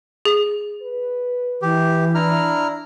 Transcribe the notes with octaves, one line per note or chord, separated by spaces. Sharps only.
G#4
B4
E3 G4
D4 E4 A#5 F6